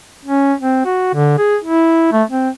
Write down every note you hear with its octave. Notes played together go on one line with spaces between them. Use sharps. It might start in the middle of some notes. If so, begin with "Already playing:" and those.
C#4
C4
F#4
D3
G#4
E4
A3
C4